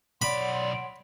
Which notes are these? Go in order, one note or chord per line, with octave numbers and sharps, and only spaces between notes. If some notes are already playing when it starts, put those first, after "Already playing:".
B1 C#5 D5 F#5 B5 C6